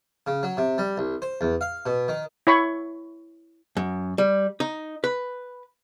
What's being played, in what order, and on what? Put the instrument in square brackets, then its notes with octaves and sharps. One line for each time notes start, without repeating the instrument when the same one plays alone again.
[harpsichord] C#3
F#3
C3
G3
C2
C5
E2
F5
B2
D#3
[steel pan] E4 C#5 B5 C#6
[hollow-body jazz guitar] F#2
G3
D#4
B4